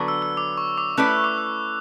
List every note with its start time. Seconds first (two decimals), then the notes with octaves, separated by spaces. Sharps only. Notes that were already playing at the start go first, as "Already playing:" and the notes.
Already playing: D3 F#3 B3 D4
0.08 E6
0.22 E6
0.37 D6
0.58 C#6
0.78 D6
0.97 A3 C#4 E4 B4 D5 F#6
1.10 E6
1.24 D6
1.38 E6